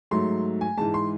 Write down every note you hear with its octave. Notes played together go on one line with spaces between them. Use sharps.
G#2 F#3 A3 C6
G#5
G#2 E3 G#3 A5
C6